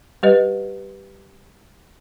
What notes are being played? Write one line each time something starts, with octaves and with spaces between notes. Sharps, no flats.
G3 G4 B4 D#5